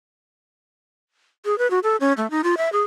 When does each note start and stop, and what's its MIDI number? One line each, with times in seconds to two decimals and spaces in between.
1.45 1.57 68
1.58 1.69 71
1.71 1.79 66
1.83 1.96 69
2.01 2.13 61
2.17 2.29 57
2.31 2.41 63
2.44 2.55 65
2.57 2.72 76
2.72 2.83 68